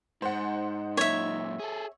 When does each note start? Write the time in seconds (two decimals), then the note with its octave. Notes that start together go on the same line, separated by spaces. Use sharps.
0.22 G#2 D#4 C5 F#5
0.97 F#2 A#2 C#5 E5
1.60 G#4 A4